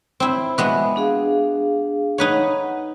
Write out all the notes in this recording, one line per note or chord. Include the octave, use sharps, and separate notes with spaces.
C4 E4
G#3 B3 F#4 E5
D4 G#4 F5
D#4 B4 C#5 F#5